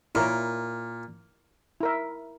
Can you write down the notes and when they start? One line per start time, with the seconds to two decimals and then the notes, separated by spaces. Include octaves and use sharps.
0.15 A#2 E4 A#4 C#5
1.80 E4 A#4 E5